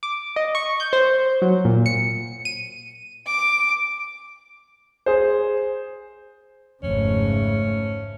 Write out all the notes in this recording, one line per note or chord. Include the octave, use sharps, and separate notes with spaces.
D6
D#5
C#6
G6
C5
F#3
A#2
C#7
D#7
D6
G#4 C5
G#1 F2 G#2 C#3 A3 C#4